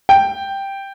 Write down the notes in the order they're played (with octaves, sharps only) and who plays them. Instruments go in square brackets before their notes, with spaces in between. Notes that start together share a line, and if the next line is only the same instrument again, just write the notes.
[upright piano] G5